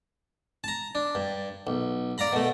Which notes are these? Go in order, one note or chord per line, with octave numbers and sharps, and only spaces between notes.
A5 A#5
D4
G2
B1
D5 F5 A#5 B5
B2 A3